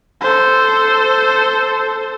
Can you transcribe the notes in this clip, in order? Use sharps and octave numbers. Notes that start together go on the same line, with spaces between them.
A4 C5